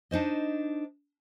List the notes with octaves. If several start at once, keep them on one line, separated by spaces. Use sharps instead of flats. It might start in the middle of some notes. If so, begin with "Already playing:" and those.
D4 D#4 C5 D#5